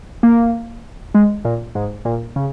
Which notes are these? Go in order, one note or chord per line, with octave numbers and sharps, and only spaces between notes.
A#3
G#3
A#2
G#2
A#2
C#3